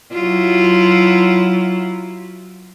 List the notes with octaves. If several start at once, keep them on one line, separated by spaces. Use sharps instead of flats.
F#3 E4 F4